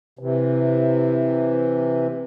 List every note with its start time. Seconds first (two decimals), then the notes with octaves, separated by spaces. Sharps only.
0.19 C3 E3